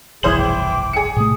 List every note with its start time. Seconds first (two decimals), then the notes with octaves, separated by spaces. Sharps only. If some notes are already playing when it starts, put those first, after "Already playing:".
0.23 F1 B1 G2 E3 G#4 C5 C#5 F#7
0.37 G5 D6
0.93 G#4 C#7
1.16 A2 C3 A3 D#6